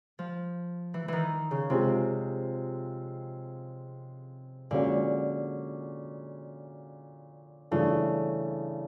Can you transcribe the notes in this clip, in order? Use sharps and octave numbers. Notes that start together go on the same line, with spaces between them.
F3
E3
D#3 E3
C#3
C3 G#3 C4 F4
A#2 D3 F3 G#3 C#4 F#4
G2 C#3 E3 A3 D4